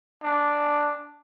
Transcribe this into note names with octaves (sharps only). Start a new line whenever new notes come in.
D4